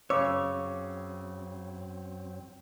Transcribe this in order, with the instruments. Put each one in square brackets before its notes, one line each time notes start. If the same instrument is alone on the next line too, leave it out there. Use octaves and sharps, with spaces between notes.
[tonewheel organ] F#2 F#3 C4 [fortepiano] C#3 E6 [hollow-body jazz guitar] C#5 [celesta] D6